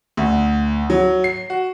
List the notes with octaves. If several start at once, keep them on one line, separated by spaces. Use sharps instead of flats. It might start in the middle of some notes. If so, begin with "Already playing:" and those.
D2
F#3
C7
F#4